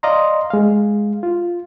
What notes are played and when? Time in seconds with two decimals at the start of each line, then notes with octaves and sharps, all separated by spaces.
0.03 D5 D#5 F5 A#5 C6
0.50 G#3 F5
1.23 F4